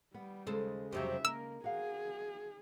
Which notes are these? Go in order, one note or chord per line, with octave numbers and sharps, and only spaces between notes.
G3 B3
D#2 C#3 G#3 A4 C5
F2 C3 F#3 G4 E5
A#3 A#4 E6
F#4 G#4 F5